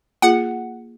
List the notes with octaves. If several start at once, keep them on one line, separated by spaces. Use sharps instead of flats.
A#3 F4 G#4 F#5